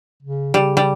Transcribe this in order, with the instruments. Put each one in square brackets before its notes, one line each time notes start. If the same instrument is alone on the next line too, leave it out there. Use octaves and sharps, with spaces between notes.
[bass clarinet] C#3
[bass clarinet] C#3 [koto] G3
[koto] G3